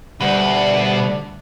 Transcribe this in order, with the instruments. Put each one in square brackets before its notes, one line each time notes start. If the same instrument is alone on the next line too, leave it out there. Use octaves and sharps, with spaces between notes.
[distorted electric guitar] D2 [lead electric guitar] B2 B4 [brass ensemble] G3 D4 [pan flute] F#5